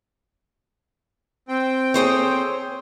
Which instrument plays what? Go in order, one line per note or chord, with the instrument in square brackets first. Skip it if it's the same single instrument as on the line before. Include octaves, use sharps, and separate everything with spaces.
[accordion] C4 G5
[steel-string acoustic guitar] G#4 C5 C#5